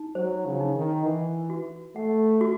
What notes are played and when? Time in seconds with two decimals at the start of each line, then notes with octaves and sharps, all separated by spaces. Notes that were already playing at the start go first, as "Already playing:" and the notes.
Already playing: D#4
0.15 F#3 C5
0.46 C#3
0.60 D#4
0.76 D#3
1.05 E3 F#5
1.50 F#4
1.96 A3 F#5
2.41 F#4